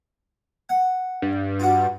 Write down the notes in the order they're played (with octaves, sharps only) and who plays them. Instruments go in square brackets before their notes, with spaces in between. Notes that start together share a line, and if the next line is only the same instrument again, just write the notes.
[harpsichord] F#5
[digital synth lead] G2
[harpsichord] F4 F#4